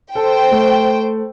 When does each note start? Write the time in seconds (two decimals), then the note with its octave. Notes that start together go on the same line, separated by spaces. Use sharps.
0.15 A4 C5 G5
0.52 A3